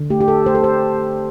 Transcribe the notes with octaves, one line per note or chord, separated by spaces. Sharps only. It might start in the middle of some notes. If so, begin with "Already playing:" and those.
Already playing: D3
A3 G4
G4
A4
A3 C5
A4
C5